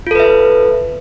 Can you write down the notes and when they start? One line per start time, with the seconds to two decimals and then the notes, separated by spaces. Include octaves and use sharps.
0.07 F4
0.11 A4
0.15 B4
0.20 E5